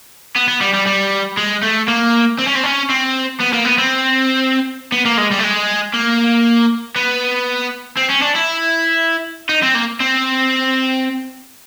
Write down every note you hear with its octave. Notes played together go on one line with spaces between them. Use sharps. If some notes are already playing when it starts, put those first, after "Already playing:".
B3
B3
G3
G3
G3
G#3
A3
A#3
C4
C#4
C4
C#4
C4
B3
A#3
B3
C4
B3
A#3
G#3
G3
A3
G#3
A#3
B3
C4
C#4
D4
E4
D#4
C4
A#3
C4